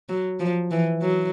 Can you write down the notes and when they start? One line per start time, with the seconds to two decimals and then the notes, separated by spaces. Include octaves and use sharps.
0.09 F#3
0.40 F3
0.71 E3
1.02 F#3